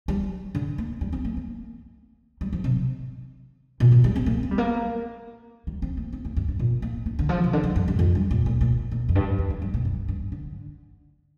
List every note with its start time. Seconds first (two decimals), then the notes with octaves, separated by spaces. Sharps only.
0.08 G3
0.55 D3
0.78 A#3
1.01 G3
1.12 C4
1.25 A#3
1.37 A#3
2.41 G3
2.53 F3
2.64 C3
3.80 A#2
3.92 A#2
4.04 G3
4.16 C4
4.26 A#3
4.43 C4
4.51 G3
4.58 A#3
5.67 G3
5.82 C4
5.97 A#3
6.12 C4
6.25 A#3
6.37 G2
6.48 G2
6.59 A#2
6.82 A#3
7.06 A#3
7.19 D3
7.29 F3
7.44 C3
7.53 D3
7.64 F3
7.76 G2
7.88 G2
7.99 F2
8.15 G2
8.31 A#2
8.46 A#2
8.61 A#2
8.91 A#2
9.09 F2
9.15 G2
9.38 F2
9.50 F2
9.62 G2
9.74 A#2
9.85 G2
10.08 G2
10.32 D3